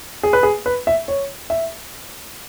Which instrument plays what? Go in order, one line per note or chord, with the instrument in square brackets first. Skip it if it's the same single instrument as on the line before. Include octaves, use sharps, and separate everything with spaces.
[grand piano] G#4
B4
G#4
B4
E5
C#5
E5